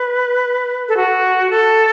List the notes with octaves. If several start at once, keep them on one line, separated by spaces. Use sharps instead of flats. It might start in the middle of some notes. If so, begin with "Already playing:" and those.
Already playing: B4
A4
F#4
A4